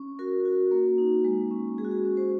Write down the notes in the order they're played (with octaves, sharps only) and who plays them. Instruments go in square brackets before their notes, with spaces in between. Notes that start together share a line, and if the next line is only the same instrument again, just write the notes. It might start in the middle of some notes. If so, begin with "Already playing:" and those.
Already playing: [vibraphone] C#4
F#4 A#4
F#4
A#3
D#4
G#3
C#4
G#3 G#4
F#4
G#4
C#4
C5